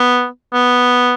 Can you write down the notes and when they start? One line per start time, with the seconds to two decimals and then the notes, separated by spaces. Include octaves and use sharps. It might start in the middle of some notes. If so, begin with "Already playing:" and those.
Already playing: B3
0.54 B3